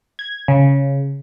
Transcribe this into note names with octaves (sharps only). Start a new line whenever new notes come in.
G#6
C#3